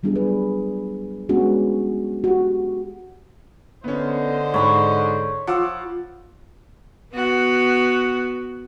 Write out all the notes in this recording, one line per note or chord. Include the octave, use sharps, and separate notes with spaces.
F#3 G3 B3 D4 F4 G#4
G#4 B4
G#3 B3 C#4 D4 F#4 G#4
F#4 G4
D3 B3 C#4 C5 D#5
G#2 C#5 B5 C#6
F3 F#5 D6 E6
B3 F#4